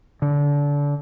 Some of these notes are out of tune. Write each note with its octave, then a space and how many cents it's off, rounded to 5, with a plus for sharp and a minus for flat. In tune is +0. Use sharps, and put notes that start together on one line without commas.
D3 -25